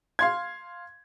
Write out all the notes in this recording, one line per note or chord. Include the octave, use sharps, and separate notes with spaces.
F5 C6 G#6